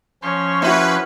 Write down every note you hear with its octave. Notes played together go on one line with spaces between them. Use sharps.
F3 C#4 C#5 C6
D#4 E4 F#4 B4